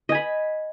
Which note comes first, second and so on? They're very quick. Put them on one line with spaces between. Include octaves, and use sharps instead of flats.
D#5 G#5 B5